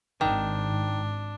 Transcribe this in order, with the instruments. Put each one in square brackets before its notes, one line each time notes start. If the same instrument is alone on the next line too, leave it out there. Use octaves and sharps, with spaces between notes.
[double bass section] G#1 [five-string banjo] D#3 [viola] D4